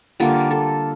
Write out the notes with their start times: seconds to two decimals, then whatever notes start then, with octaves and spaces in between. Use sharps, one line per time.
0.20 D3 G3 A#3 F4
0.51 A4